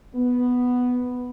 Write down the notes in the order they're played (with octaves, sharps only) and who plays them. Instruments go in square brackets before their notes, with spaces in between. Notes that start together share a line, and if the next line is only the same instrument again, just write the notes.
[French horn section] B3